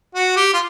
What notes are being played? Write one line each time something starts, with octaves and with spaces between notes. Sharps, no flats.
F#4
G4
F4